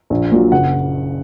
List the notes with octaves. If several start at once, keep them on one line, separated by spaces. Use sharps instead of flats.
A#1
A#2 F#3
F#1 F#5